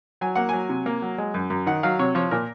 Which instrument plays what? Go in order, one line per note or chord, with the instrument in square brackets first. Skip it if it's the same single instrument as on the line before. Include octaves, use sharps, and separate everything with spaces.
[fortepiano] F#3 G#5
A#3 F#5
F#3 G#5
C3
A#3
F#3
G#3
F#2
F#2
D#3 F#5
F#3 F5
C3 C#5
F3 C#5
A#2 A#4